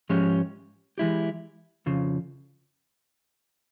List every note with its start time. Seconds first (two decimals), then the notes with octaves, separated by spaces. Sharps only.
0.09 G#2 F3 G#3 C#4 G4
0.98 E3 G#3 E4 G4
1.86 F2 C#3 F3